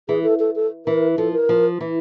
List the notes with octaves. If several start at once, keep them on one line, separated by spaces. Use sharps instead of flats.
E3 G#4
A4
A4
A4
E3 A#4
F3 A4
A#4
F3
E3